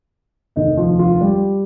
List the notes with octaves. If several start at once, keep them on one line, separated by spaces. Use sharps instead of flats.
F1 D#2 D3 D#4 D#5
F3 F4
F3 F4
G3 G4